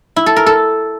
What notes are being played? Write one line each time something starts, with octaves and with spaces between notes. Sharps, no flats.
E4
A4
A#4
A4